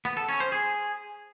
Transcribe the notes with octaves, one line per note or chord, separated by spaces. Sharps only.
B3
A4
C#4
C5
G#4